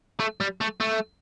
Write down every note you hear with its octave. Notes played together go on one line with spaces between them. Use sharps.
A3
G3
A3
A3